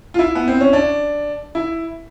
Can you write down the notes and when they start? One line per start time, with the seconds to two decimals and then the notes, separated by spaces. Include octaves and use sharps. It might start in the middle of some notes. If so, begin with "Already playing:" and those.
0.14 F4
0.19 E4
0.35 B3
0.48 C4
0.61 C#4
0.73 D4
1.55 E4